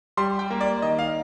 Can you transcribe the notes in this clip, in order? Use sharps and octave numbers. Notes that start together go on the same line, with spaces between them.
G3 C6
G5
A#3
D5
D#3 D#5
F5